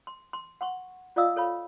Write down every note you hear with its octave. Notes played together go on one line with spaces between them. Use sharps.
C6
C6
F#5 C6 C#6
F4 D5 D#5 F5 D#6 E6
A4 C#5 F5 B5